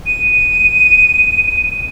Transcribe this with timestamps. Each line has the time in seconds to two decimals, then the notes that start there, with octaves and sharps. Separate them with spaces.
0.06 D#7